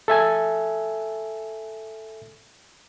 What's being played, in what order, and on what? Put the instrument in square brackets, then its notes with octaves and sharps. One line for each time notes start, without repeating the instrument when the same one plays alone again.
[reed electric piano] A4 E5 G#5